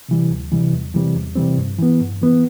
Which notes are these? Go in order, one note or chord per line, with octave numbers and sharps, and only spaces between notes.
C3 E3 G3
D2
C3 E3 G3
E2
C3 E3 G3 C4
E2
C3 E3 G3 C4
G2
E3 B3
G2
E3 B3